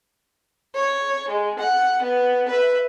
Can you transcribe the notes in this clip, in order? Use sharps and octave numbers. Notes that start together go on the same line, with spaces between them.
C#5
G#3
F#5
B3
B4 E5